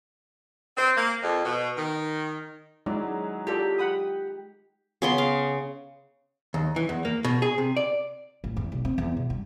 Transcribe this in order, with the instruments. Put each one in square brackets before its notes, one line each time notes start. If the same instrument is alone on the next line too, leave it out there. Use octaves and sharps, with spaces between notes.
[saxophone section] C4
A#3
F2
B2
D#3
[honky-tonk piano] F#3 C#4 E4 [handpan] G#3 D#4 [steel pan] D5
[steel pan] F4 A4 D5 [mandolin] G4
[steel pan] F#5 B5 D#6
[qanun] C#3 B3 C6
F5
[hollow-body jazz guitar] D#2
E3
E2
A#3
B2
G#4
C3
D5
[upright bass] A1
E2
B1
C4
E2
B2
G2